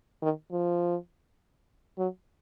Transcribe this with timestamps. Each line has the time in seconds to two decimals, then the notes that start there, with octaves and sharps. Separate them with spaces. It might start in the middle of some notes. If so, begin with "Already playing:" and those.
0.22 D#3
0.51 F3
1.98 F#3